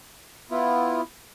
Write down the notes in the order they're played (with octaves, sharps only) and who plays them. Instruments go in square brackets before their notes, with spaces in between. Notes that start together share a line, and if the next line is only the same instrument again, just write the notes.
[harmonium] B3 E4 F4